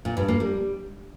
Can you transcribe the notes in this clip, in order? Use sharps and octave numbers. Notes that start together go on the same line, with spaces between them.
A#2
G2
A#3
G3